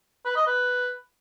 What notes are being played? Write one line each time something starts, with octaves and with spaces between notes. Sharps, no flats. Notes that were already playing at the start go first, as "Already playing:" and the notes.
B4
D#5
B4